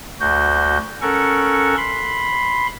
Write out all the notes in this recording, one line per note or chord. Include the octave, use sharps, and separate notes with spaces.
D2 F#4 G6
C#4 A4 A#4 F#5 C#6
B5 C6